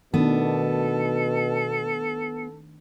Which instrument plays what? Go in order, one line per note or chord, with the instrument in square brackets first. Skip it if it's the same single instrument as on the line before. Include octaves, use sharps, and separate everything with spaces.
[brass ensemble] B2 [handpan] D#3 A3 D4 [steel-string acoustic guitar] B3 [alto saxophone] A4